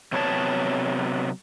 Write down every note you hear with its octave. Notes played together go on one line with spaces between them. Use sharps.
C3 F#3 B3 C5 C#5 A5